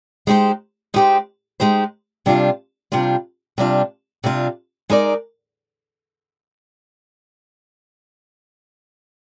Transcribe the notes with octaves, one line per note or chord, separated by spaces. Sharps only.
G#3 D#4 G4 C5
G#3 D#4 G4 C5
G#3 D#4 G4 C5
C3 G3 D4 F4
C3 G3 D4 F4
C3 G3 D4 F4
C3 G3 D4 F4
G#3 D#4 A#4 D5